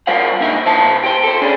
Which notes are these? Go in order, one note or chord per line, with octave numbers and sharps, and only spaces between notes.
G3 F4 A#4 C5 F5 F#5
C#2 A#2 D4 D#4 E5
C3 E4 C5 A5
G4 C5
A4 C5
C#4 D4 G#4